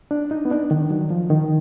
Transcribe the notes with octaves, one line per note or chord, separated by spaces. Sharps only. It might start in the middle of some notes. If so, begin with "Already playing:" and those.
D4
D#4
B3
D4
D#3
F#3
F3
D#3